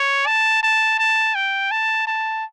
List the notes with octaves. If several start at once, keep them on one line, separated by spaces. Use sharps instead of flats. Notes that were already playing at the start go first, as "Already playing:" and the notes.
Already playing: C#5
A5
A5
A5
G5
A5
A5